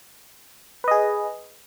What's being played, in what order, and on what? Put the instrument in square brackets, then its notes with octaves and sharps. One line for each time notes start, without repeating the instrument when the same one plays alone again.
[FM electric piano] B4
D#5
G#4